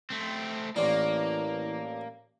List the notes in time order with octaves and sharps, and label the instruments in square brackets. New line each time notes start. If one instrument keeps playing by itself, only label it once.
[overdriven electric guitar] A3 C4
[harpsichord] A1 D4 [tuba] E3 [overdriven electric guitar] A#3